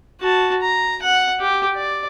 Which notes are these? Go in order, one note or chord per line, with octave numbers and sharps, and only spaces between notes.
F#4 A5
A#5
F#5
G4
D5